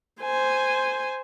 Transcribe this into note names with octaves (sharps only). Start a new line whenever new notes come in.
C5 G#5